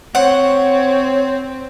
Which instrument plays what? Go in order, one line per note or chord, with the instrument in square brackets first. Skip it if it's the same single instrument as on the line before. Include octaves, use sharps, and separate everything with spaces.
[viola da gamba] C4 [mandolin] C5 F#5 [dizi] C#5